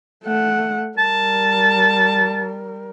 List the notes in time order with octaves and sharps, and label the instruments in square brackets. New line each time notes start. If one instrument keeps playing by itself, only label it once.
[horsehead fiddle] A3 F#5
[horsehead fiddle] G3 A#4 [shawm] A5